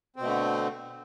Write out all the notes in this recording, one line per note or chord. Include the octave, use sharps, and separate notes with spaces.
B2 D3 A3 C4